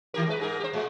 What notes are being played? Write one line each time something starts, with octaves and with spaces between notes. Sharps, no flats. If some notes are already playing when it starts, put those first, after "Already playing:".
D#3 G4 A#4
G#3 B4
G#2 G#4 A#4
G4 C5
A2 G#3